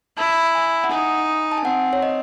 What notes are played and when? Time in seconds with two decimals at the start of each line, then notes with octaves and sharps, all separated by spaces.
0.18 E4 A5
0.55 G#5
0.84 F#5
0.91 D#4 G#5
1.52 A5
1.58 G#5
1.65 C4 F#5
1.93 C#5
2.03 D#5